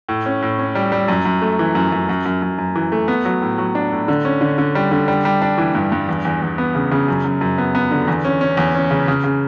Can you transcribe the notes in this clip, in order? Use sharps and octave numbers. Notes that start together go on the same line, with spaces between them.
A2
C#4
A2
C#4
G3
G3
F#2
F#2
A3
E3
F#2
F#2
F#2
F#2
F#2
F#2
E3
A3
B3
F#3
A2
F#3
D4
A2
D3
C#4
D3
D3
G3
D3
G3
G3
D4
E3
G2
G2
E2
E2
E2
B3
C#3
C#3
F#2
F#2
F#2
B3
B3
D3
E2
C#4
C#4
E2
C#4
C#3
C#3
C#3